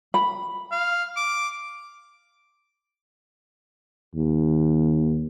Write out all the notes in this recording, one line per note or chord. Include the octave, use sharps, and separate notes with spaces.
B5
F5
D6
D#2